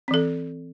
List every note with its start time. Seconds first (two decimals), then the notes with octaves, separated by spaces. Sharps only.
0.08 C4
0.11 E3
0.14 A4